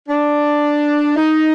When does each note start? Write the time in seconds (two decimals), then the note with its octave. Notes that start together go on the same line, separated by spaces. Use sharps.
0.09 D4
1.15 D#4